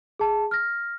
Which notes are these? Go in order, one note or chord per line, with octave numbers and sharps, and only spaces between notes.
G#4 A5
F6 A#6